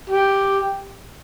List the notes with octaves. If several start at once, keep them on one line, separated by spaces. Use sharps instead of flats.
G4